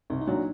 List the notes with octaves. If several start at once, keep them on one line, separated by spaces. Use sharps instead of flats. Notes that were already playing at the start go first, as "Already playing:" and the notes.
C2 D#4
D#4
A#2 F#3 D4